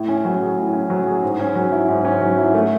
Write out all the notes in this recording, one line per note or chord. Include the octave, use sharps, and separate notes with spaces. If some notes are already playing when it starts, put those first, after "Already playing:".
Already playing: A2
C#4
F#3
G#4
A2
C#4
F#3
G#4
G#2
C#4
F#3
E4
G#2
C#4
F#3
E4
A3